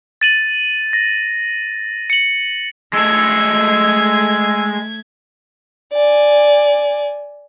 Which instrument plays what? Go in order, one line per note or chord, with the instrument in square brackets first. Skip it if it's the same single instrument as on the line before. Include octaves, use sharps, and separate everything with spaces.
[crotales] A6 D#7 F#7
A#6
C#7 F#7
[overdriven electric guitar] G#3 A4 [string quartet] A3 G#6 [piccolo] E6
[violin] D5 G#5